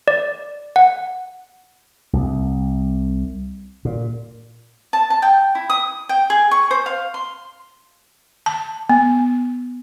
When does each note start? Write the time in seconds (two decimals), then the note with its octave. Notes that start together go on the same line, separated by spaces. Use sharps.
0.08 D5
0.76 F#5
2.13 C2
3.85 A#2
4.93 A5
5.10 A5
5.22 G5
5.55 E4
5.70 D#6
6.09 G5
6.30 G#4
6.51 C#6
6.71 C5
6.86 F5
7.14 C6
8.46 A5
8.90 B3